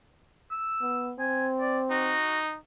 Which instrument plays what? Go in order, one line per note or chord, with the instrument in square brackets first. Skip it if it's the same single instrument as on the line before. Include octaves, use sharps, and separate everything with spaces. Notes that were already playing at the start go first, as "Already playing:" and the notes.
[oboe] E6
[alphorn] B3
[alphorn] C4 [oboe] G#5
[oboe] D5
[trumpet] D#4 [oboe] F#4